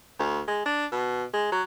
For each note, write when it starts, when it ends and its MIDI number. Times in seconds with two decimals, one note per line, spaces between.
0.19 0.41 38
0.48 0.61 56
0.66 0.86 62
0.92 1.24 47
1.33 1.50 56
1.52 1.62 54